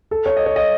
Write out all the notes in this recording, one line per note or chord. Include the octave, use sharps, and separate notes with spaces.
A4
C#5
D#5
C#5
D#5